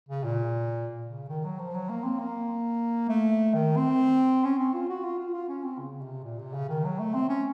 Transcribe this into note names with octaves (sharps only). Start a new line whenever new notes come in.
C#3
A#2
C#3
D#3
F#3
F3
F#3
A#3
C4
A#3
A3
D#3
C4
C#4
C4
F4
F#4
F4
F4
F4
C#4
C4
C#3
C3
A#2
C3
C#3
D#3
F#3
A3
C4
C#4